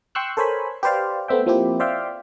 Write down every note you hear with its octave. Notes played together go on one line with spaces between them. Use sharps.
G5 C6 C#6 E6 F#6
A4 A#4 C5 C#5 G#5 B5
G4 B4 C5 D5 F5
A3 B3 C4 E5 G5
F3 A#3 C4 E4 G4
C5 D5 E5 F5 G5